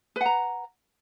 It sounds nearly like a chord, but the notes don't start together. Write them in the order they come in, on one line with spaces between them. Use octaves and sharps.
B4 F#5 A#5